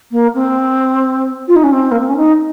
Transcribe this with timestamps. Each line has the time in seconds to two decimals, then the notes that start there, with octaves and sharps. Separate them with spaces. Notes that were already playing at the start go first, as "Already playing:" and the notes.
0.11 A#3
0.35 C4
1.48 F4
1.55 D#4
1.63 C#4
1.72 C4
1.91 A#3
2.00 C4
2.08 C#4
2.17 D#4